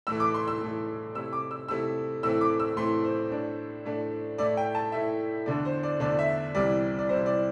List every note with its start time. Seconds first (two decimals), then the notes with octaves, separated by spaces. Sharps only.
0.07 A2 E3 A3 E6
0.20 D6
0.34 C6
0.48 E6
0.61 A2 E3 A3
1.15 C3 A3 E4 E6
1.33 D6
1.51 E6
1.68 C3 A3 E4 E6
2.23 A2 E3 A3 C4 E6
2.41 D6
2.59 E6
2.77 A2 E3 A3 C4 C6
3.04 C5
3.30 A2 A3 D4
3.85 A2 A3 D4
4.38 A2 A3 E4 D5
4.57 G5
4.75 A5
4.92 A2 A3 E4 E5
5.46 E2 D3 A3 D4 D5
5.65 C5
5.83 D5
6.00 E2 D3 A3 D4 D5
6.19 E5
6.55 C2 C3 E3 G3 E4 D5
6.98 D5
7.09 C2 C3 E3 G3 E4 C5
7.26 D5